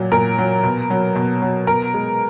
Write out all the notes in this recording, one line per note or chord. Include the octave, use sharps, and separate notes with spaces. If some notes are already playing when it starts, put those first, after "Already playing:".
Already playing: A#2 F#3
A#2 A#4
F#3
B2
F#3
B2
F#3
B2 A#4
G#3